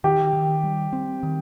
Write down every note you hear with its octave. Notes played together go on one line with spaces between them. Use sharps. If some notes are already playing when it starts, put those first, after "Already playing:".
D#3 G4
D#3
G3
C4
D#3